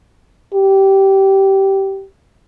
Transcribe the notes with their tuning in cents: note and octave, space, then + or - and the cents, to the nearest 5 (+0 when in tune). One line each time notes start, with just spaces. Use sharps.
G4 -15